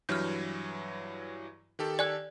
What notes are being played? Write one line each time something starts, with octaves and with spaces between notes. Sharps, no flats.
G2 E3 F#3 F6 G6
D#3 G4 A4
D5 G#5 F#6